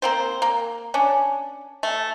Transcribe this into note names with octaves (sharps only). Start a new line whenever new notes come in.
A#3 C4 C5
A#3
C#4 D4
A3